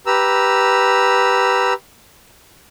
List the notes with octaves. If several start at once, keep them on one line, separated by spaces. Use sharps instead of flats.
G4 B4 A#5 E6